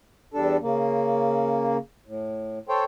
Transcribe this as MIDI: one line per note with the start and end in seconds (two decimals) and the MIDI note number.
0.34 0.57 40
0.34 0.57 55
0.34 0.57 62
0.34 0.57 69
0.62 1.77 49
0.62 1.77 58
2.06 2.59 45
2.69 2.84 69
2.69 2.84 72
2.69 2.84 73
2.69 2.84 79